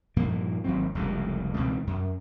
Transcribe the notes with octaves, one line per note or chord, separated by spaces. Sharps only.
G2 A#2 F3 A#3
G#1 F#3 C4
F1 C#2 A2 G3
C#2 B2 E3 C4
F#2